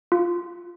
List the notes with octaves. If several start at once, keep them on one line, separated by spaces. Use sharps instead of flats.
F4